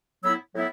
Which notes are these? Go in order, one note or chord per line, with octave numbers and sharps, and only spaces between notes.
A2 F#3 B3 E4 B5 E6
A2 F#3 B3 E4